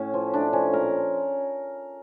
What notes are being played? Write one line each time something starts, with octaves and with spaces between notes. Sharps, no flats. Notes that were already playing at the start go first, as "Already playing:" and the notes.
Already playing: A2 C#4
F3
A3 D4
F3 C#4
A#2 A#4